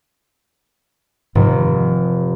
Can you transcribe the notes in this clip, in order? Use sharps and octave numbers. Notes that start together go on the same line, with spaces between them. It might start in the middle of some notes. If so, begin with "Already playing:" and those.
F1 G#2 D#3